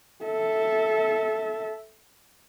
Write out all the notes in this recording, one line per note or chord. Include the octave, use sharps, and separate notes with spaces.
A4 E5